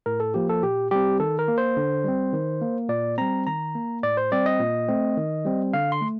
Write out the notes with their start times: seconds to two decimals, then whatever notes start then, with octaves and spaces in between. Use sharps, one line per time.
0.06 A2 A#4
0.20 A4
0.34 F3 A#3 G4
0.49 A4
0.62 A#2 G4
0.91 G3 C4 G4
1.20 D#3 A4
1.39 A#4
1.48 A#3
1.58 C5
1.77 D3
2.04 G3 C4
2.33 D#3
2.61 A#3
2.89 A#2 D5
3.18 G3 C4 A#5
3.46 D#3 A#5
3.75 A#3
4.03 A2 D5
4.17 C5
4.32 G3 C4 D5
4.46 D#5
4.60 A#2
4.88 A3 C4
5.17 D#3
5.45 G3 C4
5.73 D3 F5
5.92 C6
6.01 A3